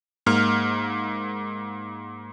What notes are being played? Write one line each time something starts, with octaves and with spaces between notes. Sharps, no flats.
G#2 A#3 F6